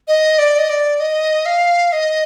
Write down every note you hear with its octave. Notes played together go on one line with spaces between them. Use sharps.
D#5
D5
D#5
D5
D#5
F5
D#5